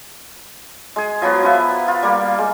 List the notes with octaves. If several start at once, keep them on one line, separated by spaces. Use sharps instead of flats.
G#3 G#4
F3 F#3 B3 F#4
F3 F4 B4 E5
F4
G3 A#3
G#3